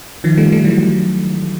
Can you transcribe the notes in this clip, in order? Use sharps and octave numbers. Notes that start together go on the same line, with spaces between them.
D#3 F3
G3 A3
G3 A3
E3 F#3